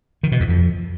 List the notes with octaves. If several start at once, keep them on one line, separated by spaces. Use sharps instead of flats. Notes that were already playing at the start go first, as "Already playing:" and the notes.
D#3
B2
E2
F2